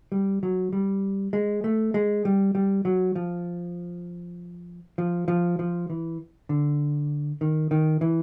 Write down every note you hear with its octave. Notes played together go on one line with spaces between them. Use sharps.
G3
F#3
G3
G#3
A3
G#3
G3
G3
F#3
F3
F3
F3
F3
E3
D3
D#3
D#3
E3